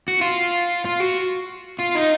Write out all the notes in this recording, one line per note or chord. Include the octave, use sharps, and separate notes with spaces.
F#4
F4
F4
F#4
F4
D#4